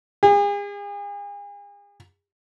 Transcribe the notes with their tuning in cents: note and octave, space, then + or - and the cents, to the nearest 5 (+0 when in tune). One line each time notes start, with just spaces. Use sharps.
G#4 -40